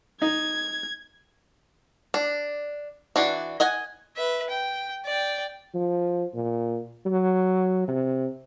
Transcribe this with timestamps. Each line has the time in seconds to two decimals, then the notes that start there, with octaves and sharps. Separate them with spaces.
0.22 D#4 G#6
2.14 D4
3.16 E3 D4 F#4
3.60 D#5 F#5 G#5
4.17 B4 E5
4.49 G5
5.05 D5 G5
5.74 F3
6.34 A#2
7.06 F#3
7.88 C3